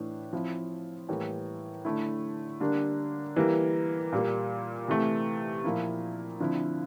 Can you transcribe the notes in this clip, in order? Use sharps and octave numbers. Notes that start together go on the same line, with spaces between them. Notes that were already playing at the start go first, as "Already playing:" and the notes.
Already playing: A2 E3 A3 D4
F3 C4 E4
A2 E3 G3 A#3
D3 A3 E4
D3 G3 A#3 D4
E3 G3 A#3
A#2 G3 A#3
C3 E3 A3
A#2 F3 A#3 E4
D3 F3 C4 E4